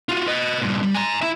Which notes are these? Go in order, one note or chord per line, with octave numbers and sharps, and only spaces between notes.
F4 F#4
B4 D#5
G2 A#2
G3
G#5 A#5
E4 E5